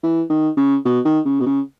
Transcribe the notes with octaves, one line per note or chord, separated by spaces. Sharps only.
E3
D#3
C#3
B2
D#3
C#3
B2
C#3